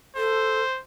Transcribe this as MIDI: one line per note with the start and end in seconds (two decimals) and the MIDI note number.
0.17 0.63 69
0.17 0.81 72